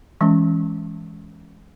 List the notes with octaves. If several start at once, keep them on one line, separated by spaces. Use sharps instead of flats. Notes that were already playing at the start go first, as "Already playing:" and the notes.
E3 G#3 C#4